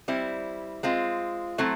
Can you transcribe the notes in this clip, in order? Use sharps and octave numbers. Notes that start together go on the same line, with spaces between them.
G3 C4 E4
G#3 C4 F4
F#3 A3 C4 E4